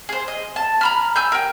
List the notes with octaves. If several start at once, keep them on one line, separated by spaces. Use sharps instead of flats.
G#4 C5
D#5
A5
A#5 B5 F6
G#5 E6 G6
A#4 G5